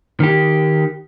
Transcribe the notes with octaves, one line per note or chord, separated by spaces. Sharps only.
D#3 G4